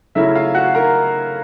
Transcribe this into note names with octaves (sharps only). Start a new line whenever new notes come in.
C#3 F#3 A3 C#4 E4 E5
F4 F5
F#4 F#5
A#4 A#5